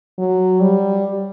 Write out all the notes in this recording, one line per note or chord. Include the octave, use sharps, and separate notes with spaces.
F#3
G3